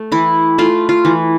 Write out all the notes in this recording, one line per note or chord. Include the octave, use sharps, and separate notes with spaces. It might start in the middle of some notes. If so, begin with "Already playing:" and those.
Already playing: A3
E3 E4
A3 F4
F4
E3